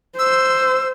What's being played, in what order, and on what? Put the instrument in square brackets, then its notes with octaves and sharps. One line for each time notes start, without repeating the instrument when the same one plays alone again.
[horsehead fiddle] C5 [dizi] E6